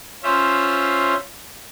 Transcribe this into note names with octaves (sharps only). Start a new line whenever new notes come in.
C#4 F4 C5 E5